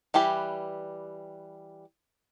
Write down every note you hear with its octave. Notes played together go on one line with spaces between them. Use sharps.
E3 G3 G4 B4